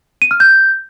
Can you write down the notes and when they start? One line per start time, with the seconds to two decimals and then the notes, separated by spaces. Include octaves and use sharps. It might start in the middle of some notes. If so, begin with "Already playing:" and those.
0.22 D#7
0.31 F6
0.40 G6